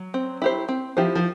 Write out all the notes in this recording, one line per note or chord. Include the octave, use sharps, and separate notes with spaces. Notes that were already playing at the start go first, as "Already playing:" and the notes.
Already playing: F#3
C4
E4 G4 C5
C4
F3 E4 G4 C5
F3